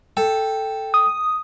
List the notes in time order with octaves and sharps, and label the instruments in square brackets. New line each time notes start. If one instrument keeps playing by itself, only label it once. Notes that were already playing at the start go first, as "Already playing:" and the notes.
[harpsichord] A4 [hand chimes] G5
[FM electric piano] D#6